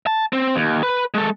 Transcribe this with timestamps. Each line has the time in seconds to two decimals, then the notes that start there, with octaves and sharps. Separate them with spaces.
0.07 A5
0.33 C4
0.56 D#2
0.83 B4
1.14 G#3 A4